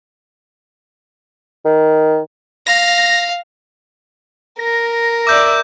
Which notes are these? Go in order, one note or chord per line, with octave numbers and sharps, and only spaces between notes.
D#3
F5 A#6
A#4 A#6
D5 E5 D6 G6